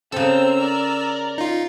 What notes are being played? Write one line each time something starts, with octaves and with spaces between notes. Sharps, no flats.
C#3 C4 A4 A#4 E6
A#4 D5
D#4 F4